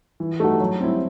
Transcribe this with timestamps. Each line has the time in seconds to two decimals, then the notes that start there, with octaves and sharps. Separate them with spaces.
0.20 E3
0.40 A3 D#4 F#4
0.60 F#3
0.80 C4 E4